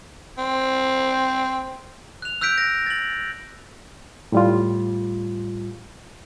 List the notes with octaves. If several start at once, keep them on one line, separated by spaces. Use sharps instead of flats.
C4
F#6 F7
E6 F#6 G6 B6 D7
A#6
A6 F#7
A2 G3 F4